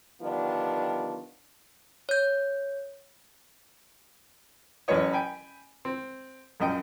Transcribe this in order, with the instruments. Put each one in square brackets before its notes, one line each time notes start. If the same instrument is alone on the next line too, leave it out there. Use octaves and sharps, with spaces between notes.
[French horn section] D3 D#3 F3 G3 B3 D4
[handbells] C#5 G6
[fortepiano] A1 F#2 C#4 B4 C#5 D#5
G5 G#5 B5
C4
A#1 F#2 D#5 G5